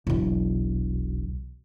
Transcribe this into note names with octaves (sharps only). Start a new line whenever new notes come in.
E1 B1